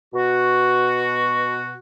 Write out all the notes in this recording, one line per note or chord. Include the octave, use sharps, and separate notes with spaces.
B2 F#4